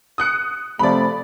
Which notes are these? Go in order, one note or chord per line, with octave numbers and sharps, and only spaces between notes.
D#6 F#6 C#7
C3 F3 A3 D5 B5